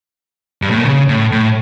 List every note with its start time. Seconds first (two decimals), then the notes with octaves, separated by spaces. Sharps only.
0.62 G2
0.71 A2
0.77 A#2
0.86 C#3
1.09 A2
1.32 A2